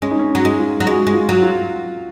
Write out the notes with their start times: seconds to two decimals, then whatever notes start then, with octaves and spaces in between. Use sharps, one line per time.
0.02 G#3 C#4
0.11 D#4
0.19 C#4
0.35 F#3
0.45 G#3
0.58 F4
0.80 F#3
0.86 G#3 F#4
1.07 G#3
1.14 F4
1.29 F#3
1.42 F4